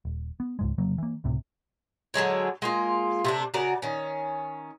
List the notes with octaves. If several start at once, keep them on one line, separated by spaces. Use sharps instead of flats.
D#1
B3
C#2 G#2 G#3
F1 C#3 F#3 A#3
E3 A#3
C#2 A2 C3
D3 F#3 G#3 C#5
G#3 A#3 F4
C3 A3 D4
C#3 F#4 A#4 D5
D#3 C#4